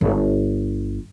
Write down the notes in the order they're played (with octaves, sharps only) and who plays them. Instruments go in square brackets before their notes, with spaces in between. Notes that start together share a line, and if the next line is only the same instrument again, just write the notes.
[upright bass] G1